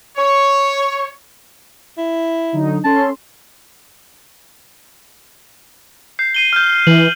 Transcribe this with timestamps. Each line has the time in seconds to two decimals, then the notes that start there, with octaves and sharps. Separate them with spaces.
0.17 C#5
1.98 E4
2.53 D3 F#3 D#4
2.84 C#4 A4 A5 C6
6.19 G6 C7
6.35 C7 D#7 G7
6.53 F6 G6
6.87 E3 F#7